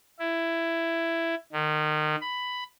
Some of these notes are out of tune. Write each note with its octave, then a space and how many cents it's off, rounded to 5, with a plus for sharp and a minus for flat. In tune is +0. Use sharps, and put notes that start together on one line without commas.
E4 +10
D#3 -30
B5 +10